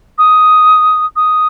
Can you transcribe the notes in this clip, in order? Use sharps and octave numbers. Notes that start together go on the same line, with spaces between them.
D#6
D#6